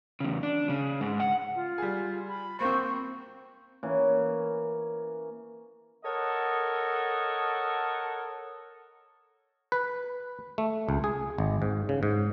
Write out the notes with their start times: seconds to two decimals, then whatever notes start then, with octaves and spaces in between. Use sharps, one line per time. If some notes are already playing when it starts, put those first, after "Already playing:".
0.20 E2 C#3
0.43 D4
0.70 C#3
1.01 G#2
1.20 F#5
1.56 F4
1.78 G3 G#4
2.28 B5
2.60 A#3 C4 C5 C#6
3.83 E3 A#3 C#4
6.05 A4 A#4 C#5 D#5 F#5
9.72 B4
10.58 A3
10.89 C#2
11.04 G#4
11.38 G#1
11.62 G#2
11.89 C#3
12.03 G#2